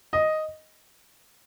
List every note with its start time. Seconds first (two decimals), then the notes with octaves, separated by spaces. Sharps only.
0.13 D#5